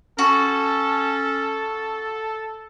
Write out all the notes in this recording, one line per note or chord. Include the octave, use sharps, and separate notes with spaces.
C#4 F#4 A4